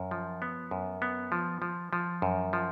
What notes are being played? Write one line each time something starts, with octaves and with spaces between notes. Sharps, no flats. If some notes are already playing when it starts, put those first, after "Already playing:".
Already playing: F#2
F3
B3
F#2
B3
F3
F3
F3
F#2
F3